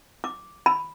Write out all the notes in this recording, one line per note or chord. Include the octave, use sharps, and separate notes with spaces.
D6
B5